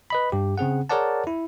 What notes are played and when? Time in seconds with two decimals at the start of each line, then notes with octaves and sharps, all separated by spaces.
0.10 B4 D#5 B5
0.32 G2 G4
0.58 C#3 C4 G#4 F#5
0.89 G#4 A#4 C#5 D5 F#5 A5
1.27 E4